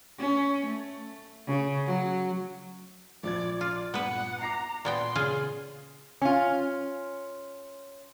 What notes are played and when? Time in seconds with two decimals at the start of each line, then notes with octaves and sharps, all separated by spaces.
0.19 C#4
0.66 A3
1.47 C#3
1.86 F#3
3.23 A#1 F3 D5 G#6
3.61 F4 D5
3.94 G2 A#2 B3 B4 F#5
4.41 A#5 D6 A#6 C7
4.85 A#2 B3 G5 C6
5.15 C#3 F4 G#4 F5
6.21 C#4 F4